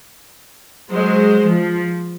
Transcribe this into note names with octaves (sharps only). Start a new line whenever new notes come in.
F#3 G#3 C5
F3